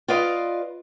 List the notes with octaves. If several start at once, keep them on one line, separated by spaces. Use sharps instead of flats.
F4 B4 D5 D#5 F5